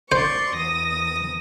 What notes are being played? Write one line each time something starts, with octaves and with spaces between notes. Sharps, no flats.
C5 D5 C6 C#6
E2 D#6 A#6